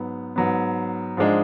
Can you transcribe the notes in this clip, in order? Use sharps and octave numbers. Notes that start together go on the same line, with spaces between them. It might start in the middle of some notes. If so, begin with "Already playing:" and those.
Already playing: G#2 F#3 B3
G#2 F#3 B3
G#2 F3 G#3 D4